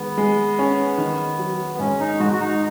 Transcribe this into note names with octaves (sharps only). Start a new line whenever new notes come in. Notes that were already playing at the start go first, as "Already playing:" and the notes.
Already playing: D#3 G#3 B3
G#3
C#4
D#3
F#3
B3
G#2 C#4
D#4
G#2 F#4
F#4
D#4